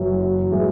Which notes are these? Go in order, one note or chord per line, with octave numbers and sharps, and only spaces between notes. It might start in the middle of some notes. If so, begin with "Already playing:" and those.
Already playing: F#1 F#2 E3 F#3
A2 E3 G#3